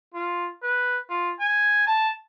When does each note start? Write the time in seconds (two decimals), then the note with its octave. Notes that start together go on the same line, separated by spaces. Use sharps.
0.14 F4
0.63 B4
1.09 F4
1.40 G#5
1.87 A5